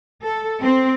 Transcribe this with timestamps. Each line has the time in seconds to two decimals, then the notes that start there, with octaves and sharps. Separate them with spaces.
0.23 A4
0.61 C4